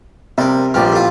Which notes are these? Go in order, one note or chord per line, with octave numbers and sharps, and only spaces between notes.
C3 G3 A#4
A#1 G2 F3 G4 F6
A2 F4